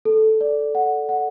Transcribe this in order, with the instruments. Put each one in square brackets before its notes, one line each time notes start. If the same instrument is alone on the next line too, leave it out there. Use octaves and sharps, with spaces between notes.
[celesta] A4
D5
F#5
F#5